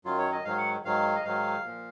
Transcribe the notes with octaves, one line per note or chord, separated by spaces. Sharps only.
F#2 D#3 F#3 F4
C#5
D#5
G#2 D#3 F#3 F5
F#5
G#2 D#3 F#3 F5
D#5
G#2 D#3 F#3 F5
A#2 F3